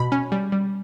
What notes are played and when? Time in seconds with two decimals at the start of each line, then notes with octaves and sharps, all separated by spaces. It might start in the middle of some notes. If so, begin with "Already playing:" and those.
Already playing: B2 B5
0.12 C#4
0.32 G3
0.52 G3